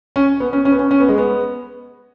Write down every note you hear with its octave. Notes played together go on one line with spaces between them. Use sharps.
C#4
B3
C#4
C#4
B3
C#4
C#4
B3
G#3
B3